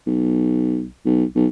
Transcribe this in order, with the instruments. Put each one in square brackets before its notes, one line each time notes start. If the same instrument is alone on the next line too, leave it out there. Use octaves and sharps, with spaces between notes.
[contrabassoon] B1
B1
B1